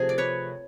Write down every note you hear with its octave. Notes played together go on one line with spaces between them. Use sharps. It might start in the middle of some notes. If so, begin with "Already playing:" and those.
Already playing: C3 F3 A3 G#4
D5
B4 C#5